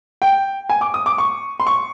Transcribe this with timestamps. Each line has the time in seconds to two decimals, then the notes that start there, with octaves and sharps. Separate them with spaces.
0.22 G5
0.69 G#5
0.81 D6
0.94 D#6
1.06 D6
1.18 C#6
1.60 C6
1.67 C#6